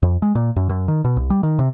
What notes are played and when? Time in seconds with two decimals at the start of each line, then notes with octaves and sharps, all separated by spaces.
0.03 F2
0.22 G#3
0.35 A#2
0.56 F#2
0.69 F#2
0.88 D#3
1.05 B2
1.17 C2
1.30 G3
1.43 D#3
1.59 C3